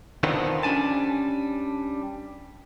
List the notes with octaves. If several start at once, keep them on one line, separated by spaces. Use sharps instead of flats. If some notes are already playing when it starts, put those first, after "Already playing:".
D3 D#3 F3 B3 C4
G3 C#4 D4 G#5 A5